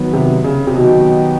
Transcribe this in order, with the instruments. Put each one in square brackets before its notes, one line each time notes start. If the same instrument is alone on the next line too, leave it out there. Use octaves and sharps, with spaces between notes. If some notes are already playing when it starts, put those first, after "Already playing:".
Already playing: [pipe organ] D#3 F#3 B3
[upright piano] C3
C#3
C3
[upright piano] B2 [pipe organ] D#3 F#3 B3 D#4 G4